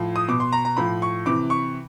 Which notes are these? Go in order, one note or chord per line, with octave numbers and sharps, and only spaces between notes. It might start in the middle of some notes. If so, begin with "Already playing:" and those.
Already playing: A2 F3
D#6
B2 D6
C6
A#5
A#5
A2 F3 B5
C#6
C3 E3 D6
C#6